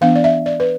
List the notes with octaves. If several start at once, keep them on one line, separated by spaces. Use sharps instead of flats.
E3 B3 D4 F5
D5
E5
D5
B4